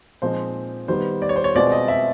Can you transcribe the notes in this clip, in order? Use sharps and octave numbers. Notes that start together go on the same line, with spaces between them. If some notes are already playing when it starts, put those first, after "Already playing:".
A#2 F3 G#3 C4 D#4 C5
D#3 G3 B3 C5
D5
C#5
C5
C#5
B2 G#3 C4 F4 D5
D#5
E5